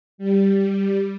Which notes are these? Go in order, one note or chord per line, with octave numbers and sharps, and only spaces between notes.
G3